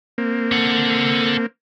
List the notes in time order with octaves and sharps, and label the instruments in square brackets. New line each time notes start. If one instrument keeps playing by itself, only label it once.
[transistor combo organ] A#3 C4
[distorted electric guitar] A4 F#5